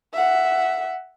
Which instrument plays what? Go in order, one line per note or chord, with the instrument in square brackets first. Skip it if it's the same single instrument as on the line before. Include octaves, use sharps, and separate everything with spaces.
[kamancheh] E5 F#5